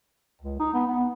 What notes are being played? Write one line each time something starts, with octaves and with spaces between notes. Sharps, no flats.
C#2
D#4
B3
B3